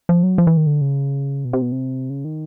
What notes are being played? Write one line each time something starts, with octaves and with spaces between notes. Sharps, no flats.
F3
F#3
F3
E3
D#3
D3
C#3
B2
C3
B2
C3
C#3
D#3